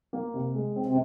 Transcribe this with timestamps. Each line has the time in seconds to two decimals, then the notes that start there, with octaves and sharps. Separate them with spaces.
0.13 A#3
0.34 C3
0.55 G#3
0.76 C4
0.86 C3